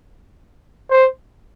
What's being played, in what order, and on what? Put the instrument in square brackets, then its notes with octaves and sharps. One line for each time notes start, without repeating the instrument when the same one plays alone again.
[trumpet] C5